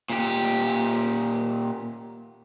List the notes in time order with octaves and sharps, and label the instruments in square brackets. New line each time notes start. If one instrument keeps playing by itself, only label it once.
[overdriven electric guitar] A#2 G4